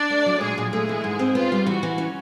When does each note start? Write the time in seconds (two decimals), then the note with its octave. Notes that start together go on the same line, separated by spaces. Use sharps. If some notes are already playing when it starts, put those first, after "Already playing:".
Already playing: D4 D5
0.10 A3
0.26 F#3
0.41 A#2 G#3 G#4
0.58 A#2
0.72 G#3 A3 G#4
0.89 E3
1.04 G#2
1.19 C4
1.35 B3 F4
1.52 G3
1.66 E3 F#4
1.83 E3
1.98 C#4